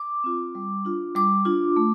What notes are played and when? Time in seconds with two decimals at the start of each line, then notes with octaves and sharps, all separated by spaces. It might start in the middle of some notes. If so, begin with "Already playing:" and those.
Already playing: D6
0.24 C4 F4
0.55 G3
0.85 D4 F4
1.15 G3 D6
1.45 D4 F4
1.77 A3